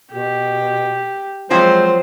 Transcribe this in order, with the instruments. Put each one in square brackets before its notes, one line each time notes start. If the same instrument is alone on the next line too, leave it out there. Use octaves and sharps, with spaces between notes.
[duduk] B2 [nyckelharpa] G4
[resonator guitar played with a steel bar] F3 F#3 C4 [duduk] G#3 [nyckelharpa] C5